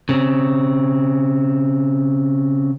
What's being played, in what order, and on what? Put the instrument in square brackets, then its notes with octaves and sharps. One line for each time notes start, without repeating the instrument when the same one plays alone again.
[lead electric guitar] C#3 C4